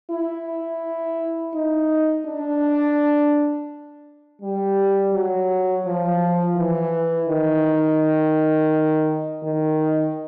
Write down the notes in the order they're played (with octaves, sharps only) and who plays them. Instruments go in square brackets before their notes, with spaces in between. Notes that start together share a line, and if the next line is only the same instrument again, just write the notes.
[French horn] E4
D#4
D4
G3
F#3
F3
E3
D#3
D#3